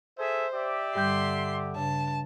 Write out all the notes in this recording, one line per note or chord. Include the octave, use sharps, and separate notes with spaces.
G#4 A4 C5 E5
G4 D5 E5
G2 D3 G3 C6 G6
G2 C#3 A5